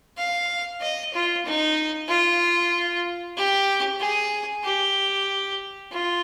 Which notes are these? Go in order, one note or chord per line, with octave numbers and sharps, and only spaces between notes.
F5
D#5
F4
D#4
F4
G4
G#4
G4
F4